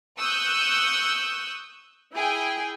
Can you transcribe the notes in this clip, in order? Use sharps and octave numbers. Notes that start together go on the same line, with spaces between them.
C#6 D#6 E6 F#6 G6
E4 G#4 G5